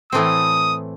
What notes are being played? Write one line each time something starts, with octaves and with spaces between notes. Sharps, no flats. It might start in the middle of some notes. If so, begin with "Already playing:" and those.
A2 E3 A3 C4 D#6